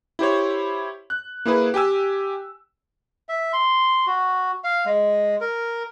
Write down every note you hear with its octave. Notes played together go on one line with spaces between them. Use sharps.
E4 G4 C5 C#5
F#6
A#3 E4 G#4 B4
G4 G5 G#5 E6
E5
C6
F#4
F5
G#3
A#4